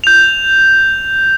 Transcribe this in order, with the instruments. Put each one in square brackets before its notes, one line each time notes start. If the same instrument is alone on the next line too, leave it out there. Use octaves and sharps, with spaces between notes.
[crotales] G6 F7